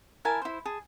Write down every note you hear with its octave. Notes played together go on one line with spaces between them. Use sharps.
E4 A#4 G#5 A5
E4 C5
G#4 A5